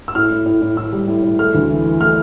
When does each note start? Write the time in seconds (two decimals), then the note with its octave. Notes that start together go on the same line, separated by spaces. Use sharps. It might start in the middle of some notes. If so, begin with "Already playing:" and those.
0.08 E6
0.15 A2 F6
0.31 A2
0.46 A2
0.62 A2
0.77 A2 E6
0.93 G3
1.08 A2
1.23 A2
1.39 A3 F6
1.55 D2
1.70 E3
1.86 E3
2.01 A3 F6